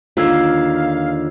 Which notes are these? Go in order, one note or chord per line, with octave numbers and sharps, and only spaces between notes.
D#2 D3 F4 A#4 F5 E6 G#6